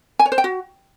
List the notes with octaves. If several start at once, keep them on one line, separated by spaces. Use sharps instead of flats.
G#5
C#5
C5
G5
F#4